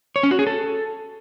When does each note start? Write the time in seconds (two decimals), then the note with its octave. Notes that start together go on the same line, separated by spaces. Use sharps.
0.16 C#5
0.23 C#4
0.31 F#4
0.39 G#4
0.47 A4